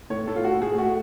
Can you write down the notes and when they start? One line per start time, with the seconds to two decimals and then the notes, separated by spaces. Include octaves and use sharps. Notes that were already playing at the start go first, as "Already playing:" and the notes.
0.10 A2 C#5
0.27 A2 A4
0.36 F4
0.44 A2 F#4
0.61 A2 G#4
0.78 A3 F#4